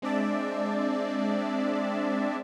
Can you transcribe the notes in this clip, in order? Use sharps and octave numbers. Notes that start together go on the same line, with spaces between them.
G#3 C4 D4 D5 E5 A5